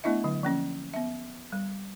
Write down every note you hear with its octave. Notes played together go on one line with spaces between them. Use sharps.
A3 B3 D4 E4 D#5 E5
D3 F#3
F3 A#3 C#4
B3 E5
G3